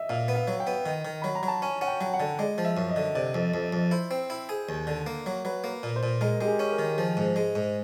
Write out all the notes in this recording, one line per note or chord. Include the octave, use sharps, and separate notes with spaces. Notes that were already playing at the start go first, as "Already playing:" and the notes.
Already playing: D#5 E5
A#2 F5
B3
F5
F#3
G5
B3
D#3
D#3
F#3 B5
A#5
F#3
A5
C#4 G#5
C#4 F#5
G5
F#3
F#5
D3
G#3 D5
F3
E5
F#2
D#5
D3
C3 D5
F2
F2
F2
E4 C5
C4
E4
G#4
D#2
D3
A#3
F#3
F#3 B4
A#3
A#2
C5
A#2
G#3 A#4
G#3 G4
G#4
C#4
A#4
D#3
F3 G#4
G#2
G#3
G#2